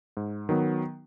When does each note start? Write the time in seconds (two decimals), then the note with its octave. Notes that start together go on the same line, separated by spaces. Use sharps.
0.17 G#2
0.49 D#3 F#3 B3